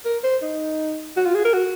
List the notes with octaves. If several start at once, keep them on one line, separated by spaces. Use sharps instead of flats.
A#4
C5
D#4
F#4
F4
G#4
A#4
F#4